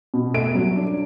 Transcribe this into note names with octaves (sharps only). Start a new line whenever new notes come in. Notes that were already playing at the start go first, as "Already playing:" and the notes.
B2
A3 D7
F#3
D4